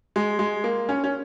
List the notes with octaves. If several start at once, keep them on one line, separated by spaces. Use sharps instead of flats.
G#3
G#3
A#3
C#4
C#4